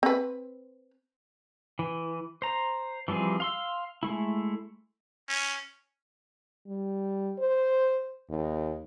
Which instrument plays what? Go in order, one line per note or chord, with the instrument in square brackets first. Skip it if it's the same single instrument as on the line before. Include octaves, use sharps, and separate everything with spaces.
[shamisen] C4 B4
[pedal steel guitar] E3
C5 A#5
E3 F3 G3 C4 G#4
F5 C6 E6
G#3 A3 E4
[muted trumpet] C#4
[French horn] G3
C5
D#2